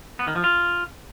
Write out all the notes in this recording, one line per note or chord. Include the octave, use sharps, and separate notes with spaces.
B3
D#3
F3
F4